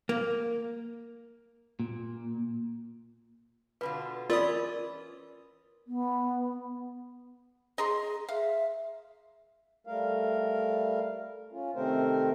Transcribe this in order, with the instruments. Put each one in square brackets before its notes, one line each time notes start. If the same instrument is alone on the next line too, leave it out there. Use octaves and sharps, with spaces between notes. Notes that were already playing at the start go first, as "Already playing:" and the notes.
[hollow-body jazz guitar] A#3
[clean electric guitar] A#2
[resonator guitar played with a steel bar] B2 D3 F4 [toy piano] B4
[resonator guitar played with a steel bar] E3 C#4 [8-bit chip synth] F4 D#6 [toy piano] A#4 [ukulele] D5
[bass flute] B3
[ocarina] G#4 [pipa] D#5 A#5 C6
[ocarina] E5 [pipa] F5
[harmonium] G3 A3 A#4 F5
C#4 F4
C3 D#3 A3 C4 A#4 C5